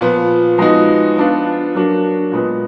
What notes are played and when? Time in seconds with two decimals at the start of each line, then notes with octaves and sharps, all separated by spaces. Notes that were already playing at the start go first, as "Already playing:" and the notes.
0.01 A#2 F3 B3
0.58 F3 G#3 B3 D#4 F#4
1.16 F3 B3 D4 F4
1.75 F#3 A#3 D4 F#4
2.32 A#2 G#3 B3